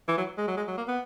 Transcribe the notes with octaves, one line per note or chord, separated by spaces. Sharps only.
E3
F#3
G#3
F#3
G#3
F#3
A#3
B3